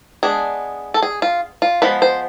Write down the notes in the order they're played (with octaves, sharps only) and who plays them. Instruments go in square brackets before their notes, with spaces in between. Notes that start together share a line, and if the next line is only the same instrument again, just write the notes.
[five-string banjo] G#3 B3 D4 G#4
A4
G#4
F4
F4
F3 G#3 B3 B4
C5